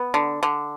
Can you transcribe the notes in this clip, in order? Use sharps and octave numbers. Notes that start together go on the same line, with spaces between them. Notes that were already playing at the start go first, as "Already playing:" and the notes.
Already playing: B3
D3
D3